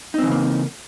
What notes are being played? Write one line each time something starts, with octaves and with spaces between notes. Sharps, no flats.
C#3 E3 A#3 C4 D#4